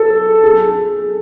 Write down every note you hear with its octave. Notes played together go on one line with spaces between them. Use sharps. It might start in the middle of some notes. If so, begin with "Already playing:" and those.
Already playing: A4
G#4